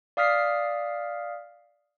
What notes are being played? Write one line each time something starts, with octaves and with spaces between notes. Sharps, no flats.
D5 F5 D#6 F6 B6 C7